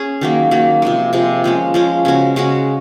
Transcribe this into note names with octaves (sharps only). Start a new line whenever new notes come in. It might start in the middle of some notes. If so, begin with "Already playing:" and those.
Already playing: C#4 G#4
D#3 F#3 A#3
D#3 F#3 A#3
C3 F3 G#3
C3 F3 G#3
F3 G#3 C#4
F3 G#3 C#4
C#3 G#3 C#4 F#4
C#3 G#3 C#4 F#4